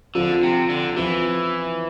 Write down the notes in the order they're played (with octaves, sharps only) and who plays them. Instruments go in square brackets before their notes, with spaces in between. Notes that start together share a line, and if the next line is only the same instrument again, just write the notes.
[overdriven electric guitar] D3 [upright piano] F3 C4 F4
[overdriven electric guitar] C3
D3
[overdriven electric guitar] E3 [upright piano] F3 C4 F4